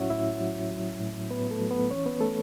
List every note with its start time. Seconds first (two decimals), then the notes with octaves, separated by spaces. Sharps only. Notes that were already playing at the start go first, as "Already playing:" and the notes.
Already playing: A2 F#3 C#4 E4 F#4 C#5 E5 F#5
0.10 A2 E4 E5
0.41 F#3
0.71 F#3
1.01 A2
1.31 A2 B3 B4
1.51 A3 A4
1.60 F#3
1.71 B3 B4
1.91 E3 C#4 C#5
2.06 B3 B4
2.21 A3 A4